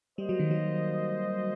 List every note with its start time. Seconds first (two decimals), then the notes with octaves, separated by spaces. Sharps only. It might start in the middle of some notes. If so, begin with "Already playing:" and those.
0.18 G3 A#3 F#4 C5 D#5
0.29 F#3
0.39 D#3
0.51 F#3